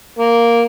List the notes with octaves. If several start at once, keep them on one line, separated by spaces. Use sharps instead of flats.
A#3